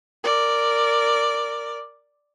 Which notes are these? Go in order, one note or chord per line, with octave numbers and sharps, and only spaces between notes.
A#4 D5